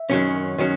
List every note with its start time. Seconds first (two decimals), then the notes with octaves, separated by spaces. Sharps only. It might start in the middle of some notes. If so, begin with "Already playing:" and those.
Already playing: E5
0.10 F#2 D#3 F#3 C#4
0.58 D#3 F#3 C#4